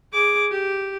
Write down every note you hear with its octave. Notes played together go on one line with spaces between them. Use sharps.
G#4 D6
G4